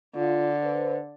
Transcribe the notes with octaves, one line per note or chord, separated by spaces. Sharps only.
D3 F4
B4 C5